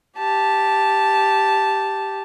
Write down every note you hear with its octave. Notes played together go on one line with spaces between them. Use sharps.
G4 A5